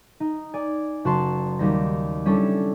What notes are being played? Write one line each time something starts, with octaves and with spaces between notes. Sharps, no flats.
D#4
D5 G#5
F#1 F#4 A5 C6 C7
D#2 G3 A#6
G3 C#4 D4 E4 A4